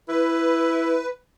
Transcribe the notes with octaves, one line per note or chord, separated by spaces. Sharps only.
E4 B4